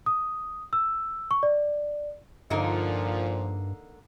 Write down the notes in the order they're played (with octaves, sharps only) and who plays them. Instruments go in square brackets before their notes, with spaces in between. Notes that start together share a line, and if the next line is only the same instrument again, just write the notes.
[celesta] D#6
E6
C#6
D5
[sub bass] G2 [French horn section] A#2 F3 [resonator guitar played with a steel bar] D3 A#3 D#4